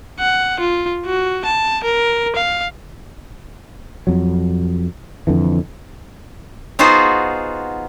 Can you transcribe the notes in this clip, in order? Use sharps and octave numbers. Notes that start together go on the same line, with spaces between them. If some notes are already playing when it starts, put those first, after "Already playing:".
F#5
F4
F#4
A5
A#4
F5
F2 F#3
F2 D3 E3
B3 D#4 F4 F#4 G#4 C5